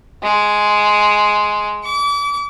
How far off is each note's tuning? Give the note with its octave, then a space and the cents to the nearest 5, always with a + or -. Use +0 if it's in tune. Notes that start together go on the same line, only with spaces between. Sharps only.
G#3 +5
D6 -35